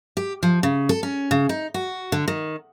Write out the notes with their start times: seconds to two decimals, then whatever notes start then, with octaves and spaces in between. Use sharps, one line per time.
0.17 G4
0.43 F3
0.63 C#3
0.89 A4
1.03 C#4
1.31 C#3
1.49 D#4
1.74 F#4
2.12 D3
2.28 D#3